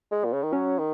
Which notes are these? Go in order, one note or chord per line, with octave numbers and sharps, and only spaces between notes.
G#3
A#2
C#3
D#3
F#3 C#4
D#3